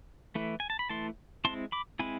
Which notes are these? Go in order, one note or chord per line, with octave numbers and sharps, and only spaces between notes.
E3 A3 E4
G#5
A5
B5
E3 A3 E4 A5 C6
G#3 C4 E4 A5 C6
B5 D6
G#3 C4 E4 G#5 B5